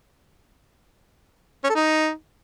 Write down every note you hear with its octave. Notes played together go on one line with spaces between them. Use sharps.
C#4
A4
D#4